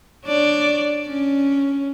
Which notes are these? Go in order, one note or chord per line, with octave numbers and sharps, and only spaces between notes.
D4 C#5 D5
C#4